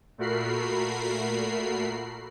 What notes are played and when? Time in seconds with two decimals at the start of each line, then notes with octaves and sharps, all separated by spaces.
0.18 A#2 A3 F#4 A#4 B5 C7